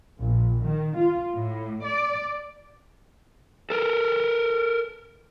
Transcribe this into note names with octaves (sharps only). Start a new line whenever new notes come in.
A#1
D#3
F4
A2
D5
A4 A#4